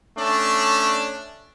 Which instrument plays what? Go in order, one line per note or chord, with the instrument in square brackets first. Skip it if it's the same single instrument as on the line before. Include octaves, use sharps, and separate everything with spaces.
[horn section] A3 C#4 D4